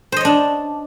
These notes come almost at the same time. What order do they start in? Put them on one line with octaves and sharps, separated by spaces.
C5 D#5 C#5 D4